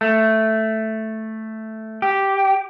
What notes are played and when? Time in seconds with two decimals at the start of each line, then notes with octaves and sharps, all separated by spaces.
0.01 A3
2.02 G4